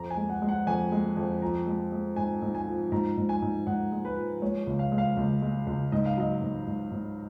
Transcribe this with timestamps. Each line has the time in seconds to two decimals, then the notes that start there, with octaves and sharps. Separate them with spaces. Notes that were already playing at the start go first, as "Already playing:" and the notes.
Already playing: F2 A#5
0.11 G#5
0.16 G#3
0.29 F#5
0.42 G#3
0.49 F#5
0.67 F2 G#5
0.92 G#3
1.17 F2
1.42 F3 A#5
1.67 G#3
1.92 G#3
2.16 G#2 G#5
2.42 G#2
2.55 G#5
2.67 F3
2.92 G#2 A#5
3.17 G#2
3.29 G#5
3.42 G#2
3.67 G#2 F#5
3.92 G#3
4.05 B4
4.17 F3
4.42 G#3 C#5
4.67 C#2
4.79 F5
4.92 G#3
4.98 F5
5.17 C#2
5.42 G#3
5.67 C#2
5.92 G#2 D#5
6.06 F5
6.17 F#3 D#5
6.42 G#2
6.67 G#2
6.91 G#2